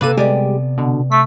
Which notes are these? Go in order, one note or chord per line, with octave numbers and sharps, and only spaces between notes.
C3 A#3 A4 B4 D5 D#7
G3 G#3 B3 G4 D5 G#5
B2 D3
A3 B6